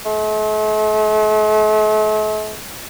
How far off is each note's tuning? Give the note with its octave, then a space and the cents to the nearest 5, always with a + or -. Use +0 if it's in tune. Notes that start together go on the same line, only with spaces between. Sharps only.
A3 -45